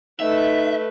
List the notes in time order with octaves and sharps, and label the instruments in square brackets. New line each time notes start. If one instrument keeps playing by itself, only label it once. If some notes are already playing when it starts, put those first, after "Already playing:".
[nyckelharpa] A3 B4 [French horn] D#4 [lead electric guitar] E5